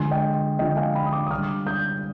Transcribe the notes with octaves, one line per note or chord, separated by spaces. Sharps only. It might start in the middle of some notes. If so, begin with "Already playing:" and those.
Already playing: D3 F3 G#3 G#5 C6
D#5 G5
D3 F3 G#3 D#5 G5
F5 G#5
G5 B5
D#6
B5 D6
D#6
D3 G3 D6 F6
D#6 G6